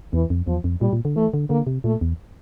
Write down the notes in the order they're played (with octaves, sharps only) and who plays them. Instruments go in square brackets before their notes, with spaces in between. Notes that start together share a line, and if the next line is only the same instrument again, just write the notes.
[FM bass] E2 [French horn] E3
[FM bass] F2
[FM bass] E2 [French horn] F3
[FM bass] F2
[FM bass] A#2 [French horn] G3
[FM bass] A#2
D3
[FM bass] E3 [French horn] A3
[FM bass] D3
[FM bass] D3 [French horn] A#3
[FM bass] C3
[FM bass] A#2 [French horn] A3
[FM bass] E2